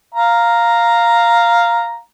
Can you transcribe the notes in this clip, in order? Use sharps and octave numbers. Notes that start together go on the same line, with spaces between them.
F5 A#5